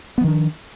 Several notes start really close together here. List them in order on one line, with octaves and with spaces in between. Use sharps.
B3 F3 D#3 D4